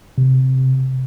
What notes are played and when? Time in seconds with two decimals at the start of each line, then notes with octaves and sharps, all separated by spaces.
0.18 C3